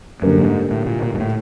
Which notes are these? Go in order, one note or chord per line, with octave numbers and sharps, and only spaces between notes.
F#2 D3 G3 A#3
G#2
A2
A#2
A#2
G#2
A2